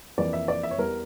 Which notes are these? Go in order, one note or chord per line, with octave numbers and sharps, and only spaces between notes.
F2 E3 A#3 D5
E5
D5
E5
C#5
E2 E3 G3 A#4